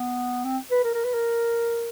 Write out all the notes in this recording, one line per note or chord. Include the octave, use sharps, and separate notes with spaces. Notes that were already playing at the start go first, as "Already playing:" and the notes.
Already playing: B3
C4
B4
A#4
A#4
B4
A#4